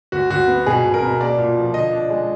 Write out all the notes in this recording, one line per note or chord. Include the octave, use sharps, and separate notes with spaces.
D2 F#4
D2 F#4
B3
B2 G#4
B2
A#4
B2
A#3 D5
A#2
F3
D3 D#5
D4
G#3